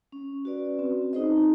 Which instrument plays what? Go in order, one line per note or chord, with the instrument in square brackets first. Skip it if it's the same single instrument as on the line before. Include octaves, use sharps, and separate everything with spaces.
[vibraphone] C#4
F#4 B4 D5
C4
D#4 G#4 C5 D#5